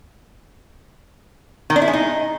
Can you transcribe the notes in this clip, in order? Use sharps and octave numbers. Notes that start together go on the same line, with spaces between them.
D#3
D4
E4
G#3
D#4